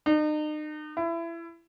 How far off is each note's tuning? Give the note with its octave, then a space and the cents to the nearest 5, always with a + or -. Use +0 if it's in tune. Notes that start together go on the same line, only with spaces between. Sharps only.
D#4 -40
E4 +25